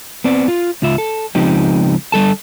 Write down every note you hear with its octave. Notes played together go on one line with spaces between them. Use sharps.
B3 C4 D5
F4
C#2 F4 E5
A4
C#2 F3 C4 D#4 G4
D3 G3 A4 A5